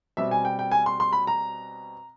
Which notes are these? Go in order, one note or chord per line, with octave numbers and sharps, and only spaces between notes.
B2 G3 C4 E5
G#5
G5
G5
G#5
C6
C6
B5
A#5